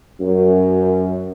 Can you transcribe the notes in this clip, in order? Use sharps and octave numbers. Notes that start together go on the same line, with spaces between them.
F#2